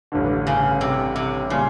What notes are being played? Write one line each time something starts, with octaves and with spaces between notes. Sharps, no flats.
A1 G2 D3
C#3
C3
C3
A#2 C#3 G3